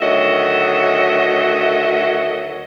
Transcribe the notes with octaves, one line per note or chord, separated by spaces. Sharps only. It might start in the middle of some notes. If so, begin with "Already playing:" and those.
D2 D#3 F#3 D#5 E5